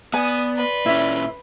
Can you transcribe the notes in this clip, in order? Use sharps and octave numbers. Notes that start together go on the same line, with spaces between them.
B3 B4 D5 G#5 D#6
B4 C6
A#2 C#4 E4 E5